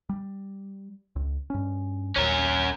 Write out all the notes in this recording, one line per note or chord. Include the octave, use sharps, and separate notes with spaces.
G3
C#2
G2 C#4
A#1 D#2 C#4 A#4